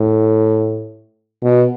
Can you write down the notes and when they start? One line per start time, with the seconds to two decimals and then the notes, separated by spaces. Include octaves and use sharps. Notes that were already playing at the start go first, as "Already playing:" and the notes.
Already playing: A2
1.43 B2